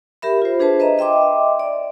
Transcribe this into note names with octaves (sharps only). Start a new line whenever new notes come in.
G4 A#4 E5 B5
F4 C5
D4 G#4 B4 C5 A5
B4 D#5 E5 A#5
D#5 E5 G5 C6 D6
D5